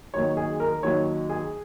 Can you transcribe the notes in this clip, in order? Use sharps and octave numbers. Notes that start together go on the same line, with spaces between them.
D#2 D#3 F#3 C#5
G#4
A#4
D#2 D#3 F#3 C#5
G#4